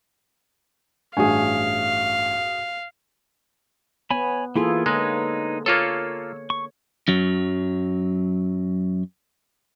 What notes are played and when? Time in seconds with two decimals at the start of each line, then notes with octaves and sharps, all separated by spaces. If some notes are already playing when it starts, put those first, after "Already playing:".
1.17 A1 G2 F#4 G#4 F5 G#5
4.11 B3 C#5 G#5 B5
4.56 E3 A#3 E4 F4 G#4 A4
4.86 D3 G#3 D#4 B4 C#5
5.66 A#3 F4 A4 C#5 E6
6.50 C#6
7.08 F#2 F#3